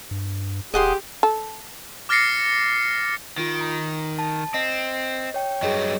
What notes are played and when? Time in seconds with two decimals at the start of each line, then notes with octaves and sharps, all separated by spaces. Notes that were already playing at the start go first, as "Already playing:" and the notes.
0.11 G2
0.74 D#1 G4 G#4 D#5 F#5 C6
1.23 A4
2.09 D6 F6 A6 A#6 C7 C#7
3.38 D#3 F4 D7
3.61 A#5
4.19 A5
4.54 C4 D#5 C7
5.34 C#5 G5
5.62 G2 F#3 G#4 C#5 D#5